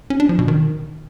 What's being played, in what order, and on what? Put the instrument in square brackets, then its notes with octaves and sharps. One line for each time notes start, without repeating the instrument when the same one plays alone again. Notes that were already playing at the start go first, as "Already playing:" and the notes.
[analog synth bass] C#4
D4
F3
B2
D#3